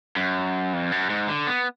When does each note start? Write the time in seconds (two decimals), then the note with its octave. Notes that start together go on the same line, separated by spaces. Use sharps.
0.16 F#2
0.73 F2
0.92 F#2
1.10 G#2
1.28 D3
1.47 B3